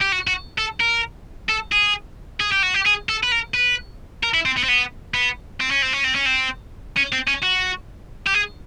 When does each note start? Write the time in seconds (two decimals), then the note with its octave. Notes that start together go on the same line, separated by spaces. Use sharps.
0.01 G4
0.12 F#4
0.27 F#4
0.58 A4
0.81 A#4
1.49 A4
1.72 G#4
2.40 G#4
2.52 G4
2.63 F#4
2.74 G4
2.86 G#4
3.09 A4
3.23 B4
3.32 A#4
3.54 B4
4.23 A#4
4.34 E4
4.45 C4
4.57 B3
4.64 C4
4.69 B3
5.14 B3
5.60 C4
5.71 C#4
5.82 C4
5.93 C#4
6.05 C4
6.16 C#4
6.26 C4
6.97 C#4
7.12 C4
7.27 C#4
7.42 F#4
8.26 G4
8.34 G#4